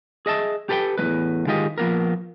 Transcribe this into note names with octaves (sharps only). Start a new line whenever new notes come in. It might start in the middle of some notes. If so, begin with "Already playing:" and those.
G#4 D#5 E5 A5
G4 A4 B4 F#5 G5
E2 A2 G#3 B4
D#3 G#3 F4 G4 D#5
F3 A#3 B3 A#4